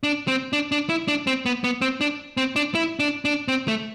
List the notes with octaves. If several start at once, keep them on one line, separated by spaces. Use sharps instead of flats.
D4
C4
D4
D4
E4
D4
C4
B3
B3
C4
D4
C4
D4
E4
D4
D4
C4
A3